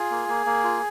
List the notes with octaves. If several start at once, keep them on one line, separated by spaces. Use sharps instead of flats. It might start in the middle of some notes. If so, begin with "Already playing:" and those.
Already playing: F4 G#4
A#3
A#3
A#3
F4